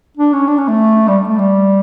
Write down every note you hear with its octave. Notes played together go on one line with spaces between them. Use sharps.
D4
C#4
D4
C#4
A3
G3
A3
G3